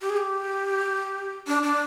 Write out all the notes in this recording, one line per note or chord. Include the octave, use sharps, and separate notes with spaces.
G4
G#4
G4
D4
D4